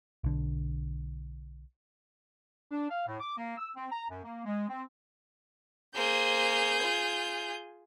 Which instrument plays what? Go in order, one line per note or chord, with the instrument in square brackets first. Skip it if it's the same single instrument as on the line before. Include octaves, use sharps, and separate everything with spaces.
[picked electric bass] B1 D3
[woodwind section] D4
F5
A2
D6
A#3
E6
C4
A#5
F#2
A#3
G#3
C4
[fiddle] A#3 C5 [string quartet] G#4 G6
[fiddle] F4